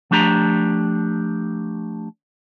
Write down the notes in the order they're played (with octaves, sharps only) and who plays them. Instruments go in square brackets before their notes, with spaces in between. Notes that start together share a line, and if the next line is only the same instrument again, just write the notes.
[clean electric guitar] F3 A3 D4 G4 A#5